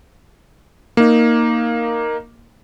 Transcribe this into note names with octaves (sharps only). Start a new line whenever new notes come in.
A#3 D#4